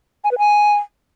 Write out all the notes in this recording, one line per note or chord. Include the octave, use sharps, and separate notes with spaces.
G#5
B4
G#5